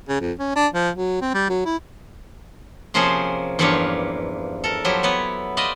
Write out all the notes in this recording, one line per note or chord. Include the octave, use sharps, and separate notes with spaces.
C#3
F2
C#4
D4
F3
F#3
C4
G3
F#3
E4
C3 F3 A#3 C#4 G#4 C5
E2 G2 F3 A#3 G4 C#5
A4 A#4
F3 F#3 E4 G4
B3 B4 C#5
B4 C5 D5 D#5 F5